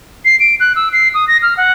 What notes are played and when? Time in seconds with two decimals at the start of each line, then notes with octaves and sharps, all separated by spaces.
0.25 C7
0.40 D7
0.60 F#6
0.76 E6
0.93 C7
1.14 D#6
1.28 A#6
1.43 F6
1.57 F#5